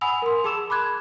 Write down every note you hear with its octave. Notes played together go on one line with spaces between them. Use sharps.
F#5 G#5 B5 D#6 E6 F7
A#4 C6
G#4 A5 D6 E6 E7
B5 D6 F#6 G#6